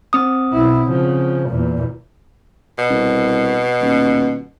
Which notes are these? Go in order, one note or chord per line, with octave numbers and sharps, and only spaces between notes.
C4 D#6
B1 E4
C#3 F3
E2 A#2
B2
C2
D#1